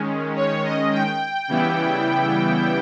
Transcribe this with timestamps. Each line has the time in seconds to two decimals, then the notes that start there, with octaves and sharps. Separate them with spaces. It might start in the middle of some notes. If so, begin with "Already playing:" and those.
Already playing: D#3 G#3 C#4
0.36 C#5
0.64 D#5
0.92 G5
1.48 C#3 E3 G3 B3 E4